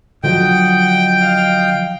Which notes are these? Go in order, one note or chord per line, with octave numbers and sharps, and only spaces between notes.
D3 F3 F#3 D#5 F#5 G5
D#5 F5